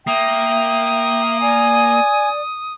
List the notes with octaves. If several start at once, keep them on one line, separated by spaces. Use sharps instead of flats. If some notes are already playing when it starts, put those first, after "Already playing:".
A#3 E5 G5 D#6
D5 G#5